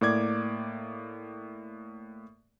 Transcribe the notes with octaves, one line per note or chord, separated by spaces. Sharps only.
A2 A#3 D5 D6 G#6